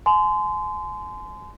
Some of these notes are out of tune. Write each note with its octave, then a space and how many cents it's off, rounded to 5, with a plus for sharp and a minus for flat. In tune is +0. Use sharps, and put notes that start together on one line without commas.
G#5 +35 C6 -25